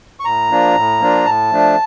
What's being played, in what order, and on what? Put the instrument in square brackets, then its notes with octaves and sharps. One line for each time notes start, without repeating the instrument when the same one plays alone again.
[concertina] C#6
[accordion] A2 [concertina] A#5
[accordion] F3 A#3 D4 F4
A2
F3 A#3 D4 F4
[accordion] A2 [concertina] A5
[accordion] F3 A3 D4